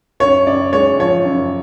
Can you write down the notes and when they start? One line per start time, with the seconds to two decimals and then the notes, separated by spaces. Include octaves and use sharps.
0.20 F#2 C#5
0.47 F#2 D5
0.73 G#3 C#5
0.99 F3 C#5
1.25 F#2